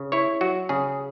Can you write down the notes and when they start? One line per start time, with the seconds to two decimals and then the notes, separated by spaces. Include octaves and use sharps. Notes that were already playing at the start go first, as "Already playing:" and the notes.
Already playing: C#3
0.12 E4 C#5
0.41 F#3 F#4
0.69 C#3 G#4